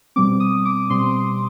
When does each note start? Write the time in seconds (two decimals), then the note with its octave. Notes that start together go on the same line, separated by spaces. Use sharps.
0.16 B2 G3 C4 D6
0.40 D#6
0.65 D6
0.90 B2 G3 C4 C6